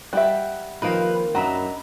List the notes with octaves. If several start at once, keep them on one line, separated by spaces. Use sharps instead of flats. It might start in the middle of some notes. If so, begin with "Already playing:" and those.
G3 G4 E5 F#5
D#3 F3 A#3 C4 B4
F#2 F#3 D4 B4 D#5 E5 A#5 B5